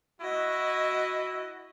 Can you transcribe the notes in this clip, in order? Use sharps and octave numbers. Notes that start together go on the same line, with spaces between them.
E4 F#4 D#5